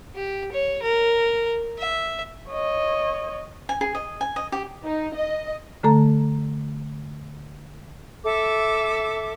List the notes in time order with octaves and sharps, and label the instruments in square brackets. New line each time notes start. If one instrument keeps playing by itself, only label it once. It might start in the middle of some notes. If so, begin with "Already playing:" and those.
[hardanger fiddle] G4
C#5
A#4
E5
[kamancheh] C#5 D#5
[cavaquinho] G#5
G#4
D#5
G#5
D#5
G4
[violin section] D#4
D#5
[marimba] D3 A3 A4 A#5
[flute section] A4 E5 D6